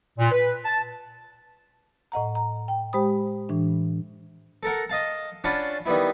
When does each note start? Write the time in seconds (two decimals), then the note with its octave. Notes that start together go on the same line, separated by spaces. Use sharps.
0.18 A#2
0.31 B4
0.65 A5
2.12 A2 D#5 F#5 A#5
2.35 A#5
2.68 G5
2.93 G#3 G4 C5 G5 B5 D#6
3.49 A2 E3 D4
4.63 A4 A#4 F#5
4.89 D#5 F5 A5
5.44 C#4 D4 F4 F#5 A5 B5
5.86 D#3 G3 B3 E4